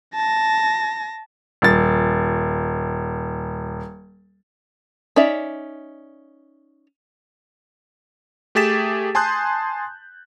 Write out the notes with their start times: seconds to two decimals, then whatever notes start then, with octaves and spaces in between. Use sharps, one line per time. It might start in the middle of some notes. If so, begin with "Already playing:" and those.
0.15 A5 A#6
1.62 D#1 A6
5.16 C#4 D#4 D5 E5
8.55 A3 G4 G#4 A6 B6 E7
9.15 G#5 A5 C6 D#6 F#6 G6